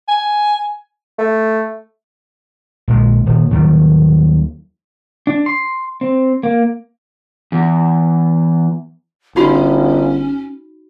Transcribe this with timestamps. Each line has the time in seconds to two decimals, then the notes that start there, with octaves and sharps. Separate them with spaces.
0.08 G#5
1.19 A3
2.88 A#1 G#3
3.26 D#1
3.51 D#2 D#3 F#3 G3
5.27 D4
5.46 C6
6.01 C4
6.43 A#3
7.52 E2
9.36 G1 C#4 D#4 F#4 B5